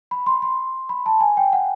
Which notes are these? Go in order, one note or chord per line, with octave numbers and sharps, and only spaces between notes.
B5
C6
C6
B5
A5
G#5
G5
F#5